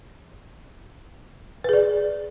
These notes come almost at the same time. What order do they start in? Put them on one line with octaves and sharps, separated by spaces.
B4 G#4 D5